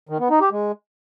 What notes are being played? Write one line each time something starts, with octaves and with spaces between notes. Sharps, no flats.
D#3
B3
D#4
G4
G#3